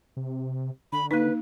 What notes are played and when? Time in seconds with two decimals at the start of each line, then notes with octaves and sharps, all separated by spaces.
0.17 C3
0.92 D3 B5
1.11 A#3 D#4 B4